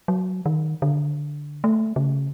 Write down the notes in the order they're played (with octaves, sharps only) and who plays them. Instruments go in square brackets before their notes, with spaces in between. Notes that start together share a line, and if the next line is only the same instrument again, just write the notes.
[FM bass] F#3
D#3
D3
A3
C#3